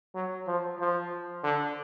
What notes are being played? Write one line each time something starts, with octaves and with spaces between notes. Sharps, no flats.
F#3
F3
F3
D3